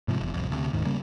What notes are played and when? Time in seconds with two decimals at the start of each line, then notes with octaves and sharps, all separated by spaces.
0.08 G#2 C3 F3
0.20 F1 E2
0.34 D1 C2 F2
0.52 D2 C3
0.73 D#1 D#2 G#2 D#3
0.85 C#3 G3 A#3 C#4